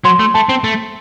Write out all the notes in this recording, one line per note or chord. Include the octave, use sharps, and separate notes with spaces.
F#3 C6
A3
A3 A5
C4
A3